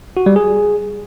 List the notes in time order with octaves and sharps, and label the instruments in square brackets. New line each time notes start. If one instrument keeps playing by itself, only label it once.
[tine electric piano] F#4
G3
G#4